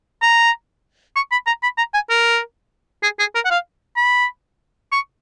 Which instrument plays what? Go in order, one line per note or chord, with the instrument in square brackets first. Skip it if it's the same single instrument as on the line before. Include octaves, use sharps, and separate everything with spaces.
[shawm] A#5
C#6
B5
A#5
B5
A#5
G#5
A#4
G#4
G#4
A#4
F#5
F5
B5
C#6